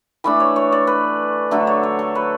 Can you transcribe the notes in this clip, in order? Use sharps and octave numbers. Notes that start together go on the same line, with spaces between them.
E3 A3 D4 B5
C#5
C#5
D5
B4
D3 F#3 A3 A4
C#5
C#5
A4
B4